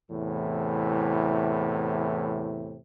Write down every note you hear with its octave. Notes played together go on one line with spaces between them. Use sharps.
E2 A2 C3 E3